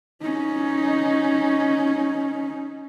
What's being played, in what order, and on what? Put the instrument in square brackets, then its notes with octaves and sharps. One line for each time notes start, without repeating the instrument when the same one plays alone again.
[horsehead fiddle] C#4 D#4